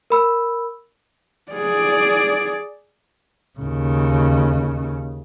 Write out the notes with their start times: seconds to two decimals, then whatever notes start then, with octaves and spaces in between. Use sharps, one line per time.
0.10 A#4 B5 E6
1.52 G#4 D5
3.59 D#2 C#3